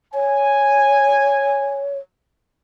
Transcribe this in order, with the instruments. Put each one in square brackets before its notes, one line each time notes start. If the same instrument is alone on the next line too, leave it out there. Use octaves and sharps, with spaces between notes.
[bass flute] C#5 [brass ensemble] G#5